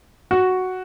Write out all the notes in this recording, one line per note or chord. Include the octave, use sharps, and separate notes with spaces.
F#4